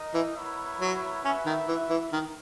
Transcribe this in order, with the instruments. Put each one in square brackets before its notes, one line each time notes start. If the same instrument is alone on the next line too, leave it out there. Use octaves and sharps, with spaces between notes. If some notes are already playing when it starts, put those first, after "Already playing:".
Already playing: [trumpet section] D#4 A#4 D#5
[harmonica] E3
[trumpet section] B3 E4 A#4 C#5 E5
[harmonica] F#3
[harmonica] C#4 [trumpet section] F#4 B4 E5
[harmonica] D#3
E3
E3
D#3